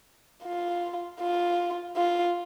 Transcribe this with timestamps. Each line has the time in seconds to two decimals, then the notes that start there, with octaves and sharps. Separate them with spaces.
0.44 F4
1.20 F4
1.97 F4